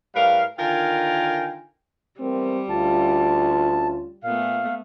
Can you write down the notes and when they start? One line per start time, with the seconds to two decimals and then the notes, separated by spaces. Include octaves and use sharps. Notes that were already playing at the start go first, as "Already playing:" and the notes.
0.15 A2 G3 A#4 B4 F5
0.59 D3 D#3 F4 A#4 G5 G#5
2.20 E2 G3 A3 C4 A#4
2.70 D2 C#4 F4 A5
4.24 A#2 A3 B3 F5